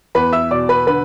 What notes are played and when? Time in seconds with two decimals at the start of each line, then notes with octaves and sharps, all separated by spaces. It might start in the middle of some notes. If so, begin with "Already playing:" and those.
0.15 E2 B4 B5
0.33 E5 E6
0.51 B2 D5 D6
0.69 B4 B5
0.87 D3 B4 B5